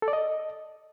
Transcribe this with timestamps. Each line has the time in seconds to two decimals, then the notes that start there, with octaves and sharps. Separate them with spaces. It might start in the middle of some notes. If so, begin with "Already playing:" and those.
0.02 A4
0.08 D5
0.13 D#5